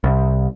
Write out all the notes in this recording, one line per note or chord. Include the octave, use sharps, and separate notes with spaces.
C2